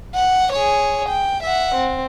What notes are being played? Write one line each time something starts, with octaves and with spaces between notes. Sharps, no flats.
F#5
G#4 C#5
G5
E5 F#5
C4